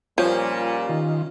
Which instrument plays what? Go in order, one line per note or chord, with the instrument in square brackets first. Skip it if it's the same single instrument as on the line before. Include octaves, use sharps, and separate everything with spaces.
[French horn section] A#2 G3 [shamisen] F3 [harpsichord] C#4
[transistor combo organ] D#3 F4